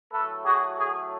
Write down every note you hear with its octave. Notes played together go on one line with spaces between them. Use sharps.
A2 F#3 A3 A4 B4
F#4 G#4
F#4 G#4